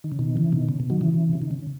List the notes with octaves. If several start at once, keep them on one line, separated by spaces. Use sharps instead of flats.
D#3
C#3
B2 D#3
C#3 E3
B2 D#3
C#3
B2
D#3 F#3
C#3 E3
C#3
D#3
C#3